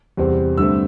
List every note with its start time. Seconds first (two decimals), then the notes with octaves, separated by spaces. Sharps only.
0.17 E2 C3 G3 C4
0.57 G2 D3 A3 C4 E6